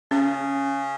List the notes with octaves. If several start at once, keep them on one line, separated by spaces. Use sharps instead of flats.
C#3 C#4